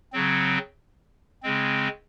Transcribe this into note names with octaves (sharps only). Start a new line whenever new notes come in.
C#3 F#3 C4
C#3 G#3 C4